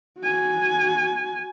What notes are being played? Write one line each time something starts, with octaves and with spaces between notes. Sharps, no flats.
F#4 G#5